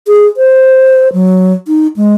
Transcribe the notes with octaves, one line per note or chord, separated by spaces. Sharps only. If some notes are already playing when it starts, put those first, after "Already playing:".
G#4
C5
F#3
D#4
G#3